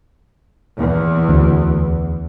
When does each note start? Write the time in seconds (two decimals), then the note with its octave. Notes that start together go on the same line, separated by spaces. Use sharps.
0.78 E2
1.29 D2